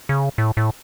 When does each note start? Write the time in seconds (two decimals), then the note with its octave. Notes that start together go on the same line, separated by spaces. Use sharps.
0.09 C#3
0.38 A2
0.57 A2